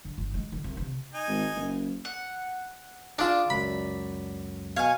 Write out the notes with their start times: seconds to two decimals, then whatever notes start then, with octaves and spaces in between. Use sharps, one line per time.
0.05 D3
0.18 G1
0.34 G#3
0.52 D3
0.64 C2
0.77 C3
1.14 D#4 G#5
1.28 G#1
1.55 F#1
2.05 F#5
3.19 D4 F4 G#4 D5 E6
3.50 C#2 F#2 F#3 B5
4.77 B2 C#5 F5 G#5